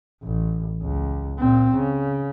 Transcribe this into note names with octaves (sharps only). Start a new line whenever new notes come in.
A1
C#2
A#2 C4
C#3